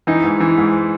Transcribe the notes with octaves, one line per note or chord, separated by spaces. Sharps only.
E3 D#4
G#2
E3
G#2